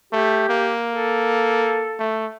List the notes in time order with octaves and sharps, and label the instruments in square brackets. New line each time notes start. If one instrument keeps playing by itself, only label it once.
[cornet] A3 [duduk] G4
[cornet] A#3
[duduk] A4
[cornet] A3